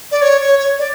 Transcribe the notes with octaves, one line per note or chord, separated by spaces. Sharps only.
D5
C#5
C#5
C#5
D5